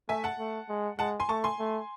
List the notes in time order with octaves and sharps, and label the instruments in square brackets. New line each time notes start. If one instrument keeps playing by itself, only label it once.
[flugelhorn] A3 [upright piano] E5 G#5
[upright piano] F#5 A5
[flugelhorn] A3
G#3
[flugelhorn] G#3 [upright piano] F#5 A5
[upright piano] G#5 C6
[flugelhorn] A3 [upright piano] A5 C#6
[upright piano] G#5 C6
[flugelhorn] A3